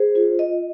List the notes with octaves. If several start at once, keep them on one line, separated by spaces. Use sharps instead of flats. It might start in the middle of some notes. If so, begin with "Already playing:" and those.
Already playing: G#4 C5
F4
D#5